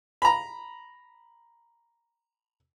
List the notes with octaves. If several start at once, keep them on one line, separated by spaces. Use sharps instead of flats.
A#5 B5